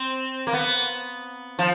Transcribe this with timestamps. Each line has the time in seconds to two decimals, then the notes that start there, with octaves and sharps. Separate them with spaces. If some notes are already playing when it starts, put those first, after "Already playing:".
Already playing: C4
0.47 A#3
0.53 B3
1.59 F3